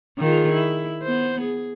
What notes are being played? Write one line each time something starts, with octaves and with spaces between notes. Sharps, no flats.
D#3 F4 G#4
E4
B3 C5
G#4